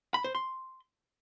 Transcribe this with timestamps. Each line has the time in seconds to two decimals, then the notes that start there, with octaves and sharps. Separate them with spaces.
0.14 B5
0.24 C5
0.35 C6